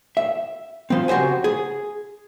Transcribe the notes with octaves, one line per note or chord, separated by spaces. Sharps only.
E5
F3 C4
C#3 F#4 G4 C5 G#5
G#4